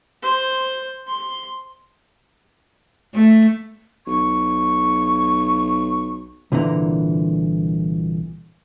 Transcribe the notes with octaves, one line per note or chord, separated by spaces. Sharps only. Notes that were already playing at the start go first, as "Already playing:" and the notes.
C5
C6
A3
B1 C#6
C2 A#2 D3 E3 A#5